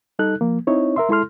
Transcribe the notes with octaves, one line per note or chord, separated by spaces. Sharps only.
G3 D#4 A4 F#6
F3 A#3
C4 D#4 E4 C#5
A#4 E5 C6
G#3 E4 A4 C6 F6